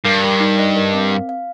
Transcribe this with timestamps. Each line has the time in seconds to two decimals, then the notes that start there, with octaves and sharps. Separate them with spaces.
0.05 G2 A#4
0.24 A#4
0.40 D#4
0.59 D#5
0.76 A#4
0.94 C4
1.12 F5
1.29 F5